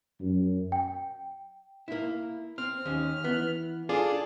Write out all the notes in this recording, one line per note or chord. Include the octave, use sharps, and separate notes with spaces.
F#2
G5
A#3 E4
C4 F6
D#2 C#4
E3 B3
D4 F4 G#4 A4 D5